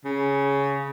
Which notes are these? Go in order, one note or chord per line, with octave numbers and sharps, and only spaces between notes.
C#3